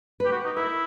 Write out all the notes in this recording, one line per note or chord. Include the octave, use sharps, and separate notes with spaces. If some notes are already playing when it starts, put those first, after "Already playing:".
B4
G4
F#4
D#4
E4 A#4